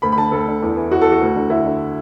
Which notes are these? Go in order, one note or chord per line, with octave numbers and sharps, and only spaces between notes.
D2 B5
B5
D3 A5
D2 A4
D3
E2
E3
E2 F#4
E3 A4
F#4
D2
D3
D2 E4
D3